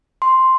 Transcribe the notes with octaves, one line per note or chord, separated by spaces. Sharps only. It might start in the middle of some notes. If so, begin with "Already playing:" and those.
C6